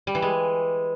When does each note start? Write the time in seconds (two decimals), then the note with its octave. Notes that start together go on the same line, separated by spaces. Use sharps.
0.07 G3
0.15 E3
0.22 G#3